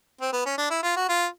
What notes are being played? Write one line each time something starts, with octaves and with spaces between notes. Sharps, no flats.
C4
B3
C#4
D4
E4
F4
F#4
F4